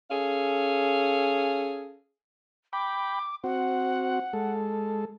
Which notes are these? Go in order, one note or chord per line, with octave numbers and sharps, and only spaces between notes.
C#4 G#4 A4 F5
G5 B5 D6
C4 F#4 F#5
G#3 A4